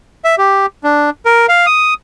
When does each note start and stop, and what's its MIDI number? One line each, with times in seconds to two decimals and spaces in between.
0.24 0.35 76
0.38 0.66 67
0.84 1.10 62
1.25 1.46 70
1.49 1.66 77
1.66 1.94 87